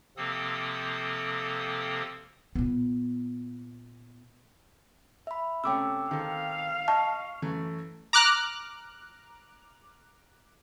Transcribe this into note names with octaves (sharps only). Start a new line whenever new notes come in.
C3 F3 A#3 C4 A4 D#6
A#2 B3
E5 B5
C3 A3 C#4 G5 D6 E6
D#3 C4 A4 F5
D#5 A5 C#6
F#2 E3 A3
A#5 D6 F6 F#6